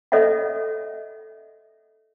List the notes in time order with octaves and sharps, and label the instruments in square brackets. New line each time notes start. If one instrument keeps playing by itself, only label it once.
[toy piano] A4 C#5 D#5 E5 F#5